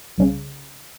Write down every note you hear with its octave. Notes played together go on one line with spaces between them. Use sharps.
C2 C#3